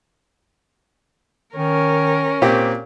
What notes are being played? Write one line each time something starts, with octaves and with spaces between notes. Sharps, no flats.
D#3 C#4 A#4
A#2 C4 G4